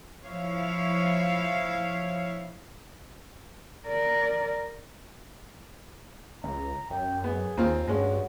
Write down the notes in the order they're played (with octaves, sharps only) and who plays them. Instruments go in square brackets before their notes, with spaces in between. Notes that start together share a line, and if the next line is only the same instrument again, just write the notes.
[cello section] F3 E4 C#5 F5
[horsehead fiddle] A#4 D5
[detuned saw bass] C#2 [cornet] A#5
[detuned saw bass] F#2 [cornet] G5
[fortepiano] B3 [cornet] G#4
[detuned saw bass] D#2 [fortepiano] A#3 C4 F4
[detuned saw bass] G2 [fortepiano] G#3 C#4 [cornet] F#4